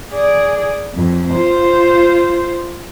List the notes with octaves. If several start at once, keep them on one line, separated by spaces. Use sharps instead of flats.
G#4 D5
F2
F4 C5